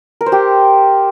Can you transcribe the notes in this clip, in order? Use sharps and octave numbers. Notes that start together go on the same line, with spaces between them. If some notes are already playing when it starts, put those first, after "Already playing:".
A#4
C5
G4